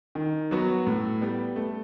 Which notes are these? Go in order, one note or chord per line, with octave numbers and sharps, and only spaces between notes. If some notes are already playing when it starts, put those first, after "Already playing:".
D#3
F#3 B3 F#4
A2
G3 B3
A3